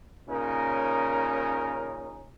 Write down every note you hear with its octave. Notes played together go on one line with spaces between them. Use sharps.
A#2 C#3 C#4 D#4 A#4